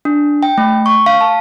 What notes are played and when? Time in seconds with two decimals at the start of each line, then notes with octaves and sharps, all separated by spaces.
0.05 D4
0.43 G5
0.58 A3
0.86 C#6
1.06 F5
1.21 A5